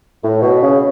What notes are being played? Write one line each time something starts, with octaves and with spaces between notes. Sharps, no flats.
A2
B2
C#3